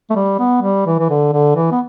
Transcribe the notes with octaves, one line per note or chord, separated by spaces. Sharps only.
A3
G3
B3
G3
E3
E3
D3
D3
E3
B3